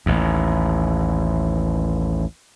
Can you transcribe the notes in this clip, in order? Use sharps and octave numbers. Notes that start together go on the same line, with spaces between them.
A1 D#2